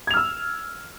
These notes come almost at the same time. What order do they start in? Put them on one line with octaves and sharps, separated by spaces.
G#6 F7 F6 E6